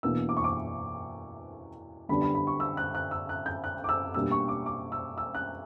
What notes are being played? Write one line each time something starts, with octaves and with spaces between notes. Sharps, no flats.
E2 B2 A#3 D4 E6
D6
C#6
D6
F#2 D3 G3 B3 D4 B5
B5
B5
C#6
E6
F#6
F#6
E6
F#6
G6
F#6
D6
E6
B2 G3 A#3 D4 E6
C#6
D6
D6
E6
E6
F#6